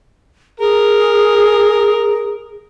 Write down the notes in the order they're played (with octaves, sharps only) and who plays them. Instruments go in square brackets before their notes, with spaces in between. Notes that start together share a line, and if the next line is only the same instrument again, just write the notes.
[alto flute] G#4 [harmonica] A#4